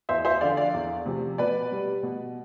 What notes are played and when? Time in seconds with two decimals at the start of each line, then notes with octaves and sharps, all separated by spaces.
0.09 E2 C5 E5
0.25 C5 E5
0.41 D3 F3 D5 F5
0.57 D5 F5
0.74 E2
1.06 C3 F3
1.38 B2 B4 D5
1.72 G3
2.03 B2